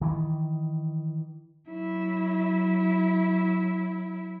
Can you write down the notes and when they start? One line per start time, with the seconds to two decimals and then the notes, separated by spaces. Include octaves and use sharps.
0.01 D#3 E3
1.69 F#3 E4